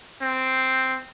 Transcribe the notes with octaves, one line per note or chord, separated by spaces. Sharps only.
C4